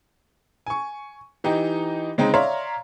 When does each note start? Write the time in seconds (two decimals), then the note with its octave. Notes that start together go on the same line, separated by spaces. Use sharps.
0.66 G#5 C#6
1.44 E3 D#4 G4
2.18 C#3 G#3 C4 D#4
2.34 C#5 D5 E5 F5 A#5 C6